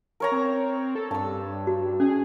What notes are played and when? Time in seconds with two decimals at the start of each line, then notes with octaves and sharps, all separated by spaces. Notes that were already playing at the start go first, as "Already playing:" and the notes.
0.20 A#4 C#5 A#5
0.32 C4
0.95 A4
1.11 G2 A5 E6
1.67 F#4
2.00 C#4 G#4